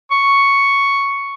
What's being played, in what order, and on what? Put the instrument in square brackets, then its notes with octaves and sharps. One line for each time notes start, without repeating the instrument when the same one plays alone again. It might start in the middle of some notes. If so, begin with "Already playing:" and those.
[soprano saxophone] C#6